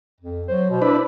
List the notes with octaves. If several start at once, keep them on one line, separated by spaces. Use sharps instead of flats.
F2
F#3 C5
B2
D4 E4 B4